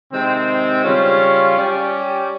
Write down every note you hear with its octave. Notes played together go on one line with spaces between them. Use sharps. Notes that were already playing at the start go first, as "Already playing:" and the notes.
C3 D#3 G#3 C4
C#3 G3 C#4 F4
G3 C#4 G4